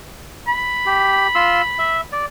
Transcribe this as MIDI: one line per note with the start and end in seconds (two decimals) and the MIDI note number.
0.47 2.07 83
0.86 1.27 67
1.35 1.62 65
1.35 1.62 84
1.35 1.62 88
1.79 2.01 76
2.12 2.26 74